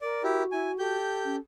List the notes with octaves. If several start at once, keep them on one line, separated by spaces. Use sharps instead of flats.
A#4 D5
E4 F#4 G4
E4 G#5
G4 A4 G6
C#4